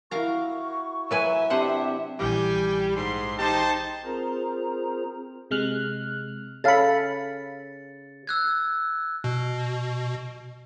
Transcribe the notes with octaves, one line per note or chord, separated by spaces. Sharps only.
E4 F#4 A#4 F5 A#5 C#6
F#3 B4 E5 G#5
C3 D4 C5 F#5 G5 C6
A#1 E3 G3 G5 G#5 D6
G#2 C6
D#4 G4 C5 A5
C4 F4 G#4 A#4 C5 A#5
C3 G#3 F6 F#6
C#3 A4 C#5 F5 B5 F6 A6 C#7
E6 F#6 G#6
B2